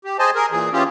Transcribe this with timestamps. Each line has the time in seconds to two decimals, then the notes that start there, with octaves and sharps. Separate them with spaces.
0.05 G4
0.19 G#4 C5 D#5 G#5 A5
0.35 G#4 A#4
0.52 A#2 E3 G#4
0.73 E3 C#4 F4 G4 G#4